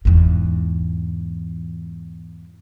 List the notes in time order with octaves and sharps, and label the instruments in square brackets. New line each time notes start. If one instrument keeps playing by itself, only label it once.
[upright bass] E2 G#2